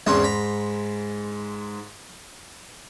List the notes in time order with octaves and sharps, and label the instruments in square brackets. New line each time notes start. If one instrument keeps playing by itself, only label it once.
[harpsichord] E2 C4 C#4 [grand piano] G#2 C6
[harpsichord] A#5 B5